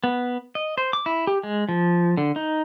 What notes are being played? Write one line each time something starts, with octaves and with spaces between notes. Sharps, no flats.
B3
D#5
C5
D6
E4
G4
G#3
F3
D3
D#4